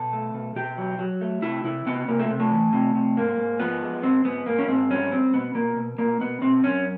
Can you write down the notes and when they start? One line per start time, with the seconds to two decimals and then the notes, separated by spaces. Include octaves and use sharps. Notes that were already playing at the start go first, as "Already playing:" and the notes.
Already playing: B2 A4
0.13 A3
0.34 B2
0.55 B2 G4
0.78 F#3
0.99 F#3
1.21 A3
1.42 C3 E4
1.64 C3 E4
1.86 C3 B3
2.08 C3 A#3
2.19 A3
2.30 C3
2.40 A3
2.51 E3
2.73 C3
2.95 C3
3.17 G#2 A#3
3.38 G#2
3.59 F3 B3
3.82 G#3
4.03 G#2 C4
4.25 G#2 B3
4.46 G#2 A#3
4.59 C#4
4.68 G#2 C4
4.90 G3 C#4
5.12 G3 C4
5.34 B2 B3
5.55 B2 A#3
5.76 B2
5.98 B2 A#3
6.21 B2 B3
6.41 B2 C4
6.64 F#2 C#4